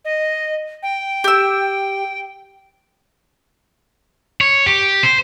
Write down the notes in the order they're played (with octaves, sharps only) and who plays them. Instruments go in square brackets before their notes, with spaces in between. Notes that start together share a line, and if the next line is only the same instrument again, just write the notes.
[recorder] D#5
G5
[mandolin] G4 E6
[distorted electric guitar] C#5
G4
C5